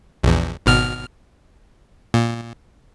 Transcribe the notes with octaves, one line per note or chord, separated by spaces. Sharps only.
A#1 E2
G#1 B2 F6
A#2